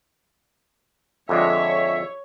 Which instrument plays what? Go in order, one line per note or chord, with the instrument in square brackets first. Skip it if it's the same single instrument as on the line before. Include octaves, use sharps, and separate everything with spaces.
[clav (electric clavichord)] F2 D3 G#3 [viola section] C#5 [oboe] E5